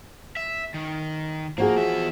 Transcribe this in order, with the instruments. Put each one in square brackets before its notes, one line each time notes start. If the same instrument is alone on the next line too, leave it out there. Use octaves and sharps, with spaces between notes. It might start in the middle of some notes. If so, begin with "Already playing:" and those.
[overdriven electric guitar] E5
D#3
[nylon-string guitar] F3 F#4 G#4 [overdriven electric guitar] A#3
[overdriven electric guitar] E2 E5